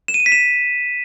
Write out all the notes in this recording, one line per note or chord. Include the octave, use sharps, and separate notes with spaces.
E7
D#7
E7
B6
E7